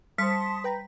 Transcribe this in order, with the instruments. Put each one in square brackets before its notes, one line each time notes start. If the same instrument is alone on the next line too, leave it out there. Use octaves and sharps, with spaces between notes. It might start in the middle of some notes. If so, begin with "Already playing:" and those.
[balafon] G3 C5 [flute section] A5 C6 D#6 [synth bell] B6 [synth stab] C#7
[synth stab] B4 G5 A#5